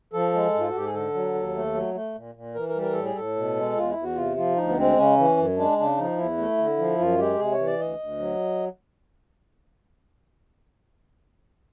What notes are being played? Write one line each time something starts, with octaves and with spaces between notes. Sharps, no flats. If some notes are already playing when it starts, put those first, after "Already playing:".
F3 A4
G#3
G#2
F4
F#4
G#2 G4
G#4
D3 A4
F#3
D#2
A3
F#3
A3
A#2
A#2
E3 A#4
A#4
G3
A#4
A2 A4
G#4
A2 A4
B2
G#3
E2 F4
E4
E2
F#4
C3 F4
F3 F4
D2 D#4
B3
G#3 C4
C#3 C#4
E3
F#2
G#3 D4
C#3 D4
F3 D#4
E2 E4
A3
D3
F3
F#2 F4
G#3 G4
C3 G#4
C#5
E3
D5
D2 D#5
D2
F#3